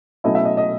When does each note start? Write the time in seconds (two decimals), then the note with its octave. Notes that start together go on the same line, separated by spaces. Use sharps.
0.24 B2 F#3 A3 C#4 E4 D#5
0.35 E5
0.45 D#5
0.57 D#5